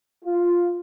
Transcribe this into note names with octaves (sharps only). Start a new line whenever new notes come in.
F4